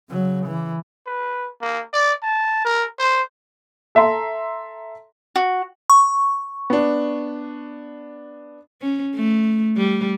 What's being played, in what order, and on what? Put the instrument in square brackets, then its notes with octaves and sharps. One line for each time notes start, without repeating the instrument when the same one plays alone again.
[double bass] C#3 F#3
E3
[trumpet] B4
A#3
D5
A5
A#4
C5
[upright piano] A4 E5 A#5 C6
[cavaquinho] F#4
[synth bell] C#6
[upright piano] B3 D4
[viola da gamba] C#4
A3
G3